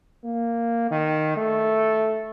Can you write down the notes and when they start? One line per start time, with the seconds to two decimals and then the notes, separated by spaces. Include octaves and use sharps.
0.25 A#3
0.91 D#3
1.37 A3